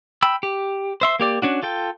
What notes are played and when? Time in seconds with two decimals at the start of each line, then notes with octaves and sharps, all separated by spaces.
0.22 G5 B5 E6
0.43 G4
1.01 C5 E5 C6
1.20 A#3 G4 D5
1.42 C#4 D4 F#4
1.63 F4 A4 G5